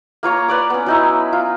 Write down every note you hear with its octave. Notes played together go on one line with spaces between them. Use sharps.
A#3 F4 C#5 A#5
B4 D5 D6
B3 C#4
F#3 D#4 E4
F4